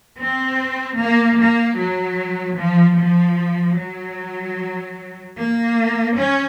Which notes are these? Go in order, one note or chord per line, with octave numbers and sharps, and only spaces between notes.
C4
A#3
A#3
F#3
F3
F3
F#3
A#3
C#4